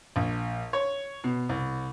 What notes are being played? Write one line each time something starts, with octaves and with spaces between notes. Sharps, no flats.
A#1
C#5
B2
C2